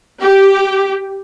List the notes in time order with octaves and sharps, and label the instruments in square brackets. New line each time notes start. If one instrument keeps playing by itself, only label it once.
[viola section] G4